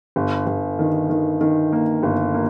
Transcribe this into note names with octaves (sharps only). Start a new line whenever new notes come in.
G1
G1
D#3
D#3
D#3
A#3
G1
A#3